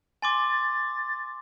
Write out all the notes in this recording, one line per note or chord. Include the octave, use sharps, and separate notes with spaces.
G#5 C6 D6 A6